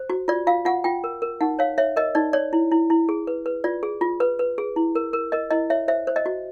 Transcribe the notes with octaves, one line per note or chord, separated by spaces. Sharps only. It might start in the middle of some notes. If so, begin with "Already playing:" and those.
Already playing: C5
F#4
F4 D5
F4 F5
F4 F#5
F4 G5
A#4
A#4
D#4 F#5
C#5 F5
C#5 E5
A#4 D#5
D#4 D5
C#5 D5
E4
E4
E4
G#4
B4
B4
F4 D5
G#4
F4
B4
B4
G#4
E4
A#4
A#4
A#4 D#5
E4 D#5
C#5 E5
C5 E5
C5
D#5
F#4